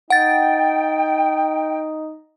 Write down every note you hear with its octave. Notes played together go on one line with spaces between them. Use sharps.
D#4 F#5 G5 A6